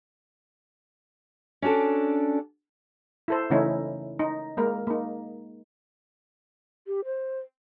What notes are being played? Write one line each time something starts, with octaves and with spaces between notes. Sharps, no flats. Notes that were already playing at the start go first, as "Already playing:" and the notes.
C#4 D4 F#4 A4 D5
E4 A4 C5
C#3 E3 A3 C#4 D#4 E4
D#4
G#3 A#3 A#4
A#3 D#4
G4
C5